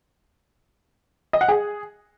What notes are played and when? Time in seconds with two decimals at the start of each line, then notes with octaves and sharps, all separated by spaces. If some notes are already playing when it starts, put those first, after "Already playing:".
1.33 D#5
1.41 F#5
1.48 G#4